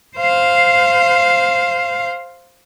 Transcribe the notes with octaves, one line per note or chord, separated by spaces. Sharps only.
C5 F5